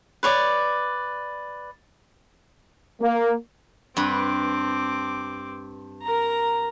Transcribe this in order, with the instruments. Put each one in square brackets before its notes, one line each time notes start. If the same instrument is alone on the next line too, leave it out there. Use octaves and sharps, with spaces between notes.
[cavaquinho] B4 C#5 D5
[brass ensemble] A#3
[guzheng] G2 B4 [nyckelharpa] C4 D6
[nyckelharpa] A#4 A#5